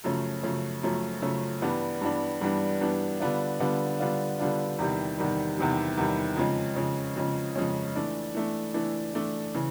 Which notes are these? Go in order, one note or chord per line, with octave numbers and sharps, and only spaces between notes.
F#2 C#3 F3 A3 C#4
F#2 C#3 F3 A3 C#4
F#2 C#3 F3 A3 C#4
F#2 C#3 F3 A3 C#4
G2 E3 G3 B3 D4
G2 E3 G3 B3 D4
G2 E3 G3 B3 D4
G2 E3 G3 B3 D4
D3 G3 B3 D4 F4
D3 G3 B3 D4 F4
D3 G3 B3 D4 F4
D3 G3 B3 D4 F4
E2 C3 D#3 G3
E2 C3 D#3 G3
E2 C3 D#3 G3
E2 C3 D#3 G3
F2 C#3 F3 G#3 C#4
F2 C#3 F3 G#3 C#4
F2 C#3 F3 G#3 C#4
F2 C#3 F3 G#3 C#4
E3 A3 D4
E3 A3 D4
E3 A3 D4
E3 A3 D4
C#3 E3